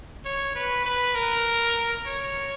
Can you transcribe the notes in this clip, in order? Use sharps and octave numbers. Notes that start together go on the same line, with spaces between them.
C#5
B4
B4
A#4
C#5